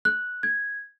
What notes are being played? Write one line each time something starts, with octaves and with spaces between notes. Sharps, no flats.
F#6
G#6